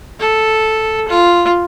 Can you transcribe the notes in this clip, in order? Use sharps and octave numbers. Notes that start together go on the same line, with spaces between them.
A4
F4